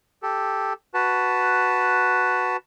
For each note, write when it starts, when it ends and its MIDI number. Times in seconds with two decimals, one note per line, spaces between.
0.23 0.73 67
0.23 0.73 69
0.94 2.57 66
0.94 2.57 71
0.94 2.57 81